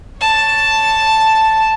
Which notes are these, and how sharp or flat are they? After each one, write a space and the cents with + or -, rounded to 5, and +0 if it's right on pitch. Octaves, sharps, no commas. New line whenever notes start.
C#5 +0 A5 +0